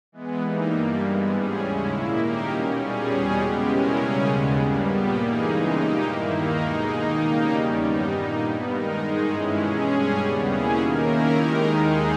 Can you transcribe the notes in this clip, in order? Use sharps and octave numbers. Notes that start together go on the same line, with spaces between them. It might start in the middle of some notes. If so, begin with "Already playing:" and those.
E3 G#3 B3
E3 G3 A#3 D#4
G2 G3 A#3
G2 E3 G#3 B3
G#2 G3 C#4 G#4
D#2 C#3 G#3 C#4 E4
A#2 A#3 E4
D#3 A#3 D#4 G4 A#4
B2 G3 C#4
A#2 G3 C#4 G#4
E2 B2 G3 C#4 G#4
C#3 G#3 B3 G4
B2 G#3 C#4 E4 A#4
C#3 G3 C#4 G#4
D#2 C#3 G#3 B3
G2 G3 A#3
A#2 G3 B3 G4
E3 A#3 D#4 G#4
E2 C#3 E3 G#3 D#4
A#2 A#3 D#4 G4
G2 D#3 A#3 E4
D#2 D#3 A#3 D#4 A#4
B2 G#3 D#4 G#4
D#3 A#3 D#4
C#3 G3 A#3 D#4 G4
E2 D#3 G3 C#4
G2 G3 B3 D#4
A#2 A#3 D#4
G2 G3 B3
D#3 G#3 D#4 A#4
G#2 D#3 G#3 D#4 G#4
G2 E3 G#3 C#4 E4
B2 G#3 C#4 G#4
G2 G3 C#4 G#4
D#2 C#3 G3 B3
B2 A#3 C#4 E4 G#4
D#3 A#3 D#4 A#4
D#3 A#3 C#4 E4 A#4
D#3 G#3 D#4 G4 A#4
D#2 D#3 G#3 D#4 G#4